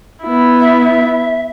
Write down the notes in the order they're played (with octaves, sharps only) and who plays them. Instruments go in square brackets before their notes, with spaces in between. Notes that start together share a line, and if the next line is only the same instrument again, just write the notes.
[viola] B3 E4
[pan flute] E5